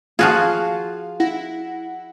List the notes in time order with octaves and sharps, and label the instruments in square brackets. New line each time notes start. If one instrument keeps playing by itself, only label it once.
[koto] F3 F#4 G#4 [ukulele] F4 [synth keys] F5
[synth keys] E4 F#5 A#6